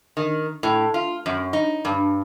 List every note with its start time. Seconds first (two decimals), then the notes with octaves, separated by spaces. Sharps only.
0.17 D#3
0.63 A2
0.94 F4
1.26 F#2
1.53 D#4
1.85 G2